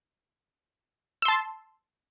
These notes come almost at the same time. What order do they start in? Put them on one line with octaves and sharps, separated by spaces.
E6 C6 A5